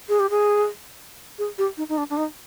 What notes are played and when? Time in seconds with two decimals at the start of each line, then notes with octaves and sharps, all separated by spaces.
0.09 G#4
0.20 G4
0.30 G#4
1.39 G#4
1.58 G4
1.77 D#4
1.89 D#4
1.98 D4
2.10 D4
2.17 D#4